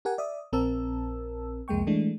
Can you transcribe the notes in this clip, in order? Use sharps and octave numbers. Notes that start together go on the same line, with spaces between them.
G4 A#4 F#5 G#5
D5 E5 D#6
A#1 C4 A#4 A5 E6
C2 F2 G#3 A#3 G5 C#6
E3 G#3 A3 D4